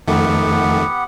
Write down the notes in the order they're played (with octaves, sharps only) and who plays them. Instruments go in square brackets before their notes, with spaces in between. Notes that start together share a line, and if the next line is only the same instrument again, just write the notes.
[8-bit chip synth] F2 D#3 A3 [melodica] B3 G4 F#5